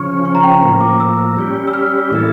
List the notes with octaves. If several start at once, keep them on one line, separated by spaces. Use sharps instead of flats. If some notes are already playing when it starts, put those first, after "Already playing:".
Already playing: C#3 F3 C#4 C#6
C#6
A#5
G5
A2 F3 A#3 A#5
D6
E6
G3 C#4 G4
E6
F6
A2 E3 A#3 E4 A4